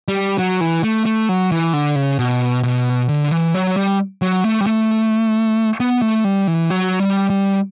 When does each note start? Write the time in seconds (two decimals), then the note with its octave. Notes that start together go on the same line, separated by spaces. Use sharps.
0.08 G3
0.38 F#3
0.61 E3
0.84 A3
1.05 A3
1.29 F#3
1.52 E3
1.73 D3
1.95 C#3
2.19 B2
2.63 B2
3.09 D3
3.31 E3
3.55 F#3
3.76 G3
4.22 F#3
4.44 A3
4.60 G3
4.66 A3
5.80 B3
6.02 A3
6.24 G3
6.47 E3
6.70 F#3
7.00 G3
7.30 G3